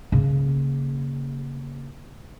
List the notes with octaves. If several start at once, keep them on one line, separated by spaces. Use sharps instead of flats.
C#3 A#3